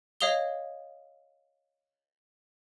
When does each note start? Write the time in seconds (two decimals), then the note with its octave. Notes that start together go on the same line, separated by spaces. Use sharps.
0.21 C#5 D#5 F5 D#6 F7 G7